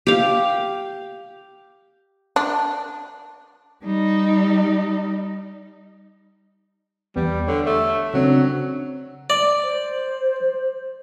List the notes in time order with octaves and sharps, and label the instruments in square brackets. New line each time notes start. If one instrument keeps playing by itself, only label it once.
[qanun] G4 F5
[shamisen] D4
[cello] G3 D#4
[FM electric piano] E2 B3 [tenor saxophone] G3
[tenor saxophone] D3 [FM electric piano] C#5
[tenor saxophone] A3
[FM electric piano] C#3 C4 D4 [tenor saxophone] F#3
[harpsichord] D5
[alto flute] C5